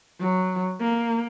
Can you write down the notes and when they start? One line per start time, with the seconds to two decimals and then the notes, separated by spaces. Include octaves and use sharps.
0.20 F#3
0.80 A#3